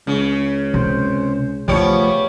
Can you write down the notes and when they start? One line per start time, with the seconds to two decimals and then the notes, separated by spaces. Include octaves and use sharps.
0.07 C#2 C#3
0.74 C3 C5
1.68 C#3 F3 G3 A3 B3 C#5